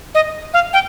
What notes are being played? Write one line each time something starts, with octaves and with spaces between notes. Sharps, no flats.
D#5
F5
G5